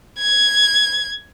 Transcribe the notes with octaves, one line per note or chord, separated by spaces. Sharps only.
G#6